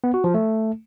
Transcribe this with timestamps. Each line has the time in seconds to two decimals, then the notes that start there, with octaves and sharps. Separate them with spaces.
0.04 B3
0.14 F#4
0.24 F3
0.34 A3